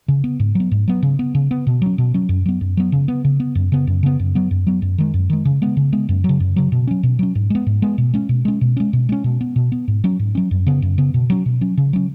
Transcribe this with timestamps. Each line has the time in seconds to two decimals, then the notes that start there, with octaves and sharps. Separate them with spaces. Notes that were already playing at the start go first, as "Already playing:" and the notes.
0.08 C#3
0.24 B3
0.40 G#2
0.55 F#3 B3
0.71 G#2
0.88 F#3 B3
1.03 C#3
1.19 B3
1.35 C#3
1.51 B3
1.67 B2
1.82 F#3 C#4
1.98 B2
2.14 F#3 C#4
2.29 F#2
2.46 F#3 B3
2.61 F#2
2.77 F#3 B3
2.92 C#3
3.08 B3
3.24 C#3
3.40 B3
3.55 F#2
3.72 C#3 B3
3.87 F#2
4.03 C#3 B3
4.19 F#2
4.35 F#3 B3
4.51 F#2
4.67 F#3 B3
4.82 F#2
4.98 D#3 G#3
5.14 F#2
5.30 D#3 G#3
5.45 C#3
5.62 G#3 B3
5.77 C#3
5.92 G#3 B3
6.09 F#2
6.24 F#3
6.29 C#3
6.40 F#2
6.56 C#3 F#3
6.72 B2
6.87 F#3 C#4
7.03 B2
7.19 F#3 C#4
7.35 G#2
7.50 G#3 B3
7.66 G#2
7.82 G#3 B3
7.98 B2
8.13 G#3 C#4
8.29 B2
8.45 G#3 C#4
8.61 B2
8.77 G#3 C#4
8.93 B2
9.09 G#3 C#4
9.24 B2
9.41 B3
9.56 B2
9.72 B3
9.88 G#2
10.04 F#3 C#4
10.19 G#2
10.35 F#3 C#4
10.51 F#2
10.66 C#3 B3
10.82 F#2
10.98 C#3 B3
11.14 B2
11.30 F#3 C#4
11.46 B2
11.61 F#3 C#4
11.77 C#3
11.93 F#3 C#4